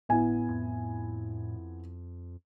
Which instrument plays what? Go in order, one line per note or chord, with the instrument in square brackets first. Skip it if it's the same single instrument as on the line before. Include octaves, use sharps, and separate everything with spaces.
[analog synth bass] G1 [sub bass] A2 [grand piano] B3 E4 G#5
[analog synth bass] F2